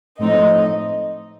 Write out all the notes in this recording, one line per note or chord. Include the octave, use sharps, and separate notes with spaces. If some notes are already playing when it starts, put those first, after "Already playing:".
A2 F3 A3 C4 D#4 D#5